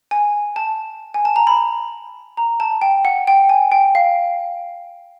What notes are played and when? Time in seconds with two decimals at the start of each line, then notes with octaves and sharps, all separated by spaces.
0.11 G#5
0.56 A5
1.14 G#5
1.25 A5
1.36 A#5
1.47 B5
2.37 A#5
2.60 A5
2.81 G5
3.05 F#5
3.27 G5
3.49 G#5
3.72 G5
3.95 F5